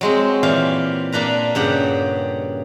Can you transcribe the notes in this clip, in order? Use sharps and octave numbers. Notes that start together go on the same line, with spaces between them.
F#3 G#3 C4
A#2 E3 G4 F5
A#2 A#3 D4 B4 A#5
G2 C#3 G4 F#5